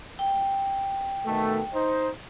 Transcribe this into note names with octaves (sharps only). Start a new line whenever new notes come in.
G5
B2 D#3 A3
D#4 C5